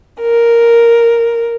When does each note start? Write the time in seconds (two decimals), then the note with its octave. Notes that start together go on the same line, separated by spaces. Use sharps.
0.22 A#4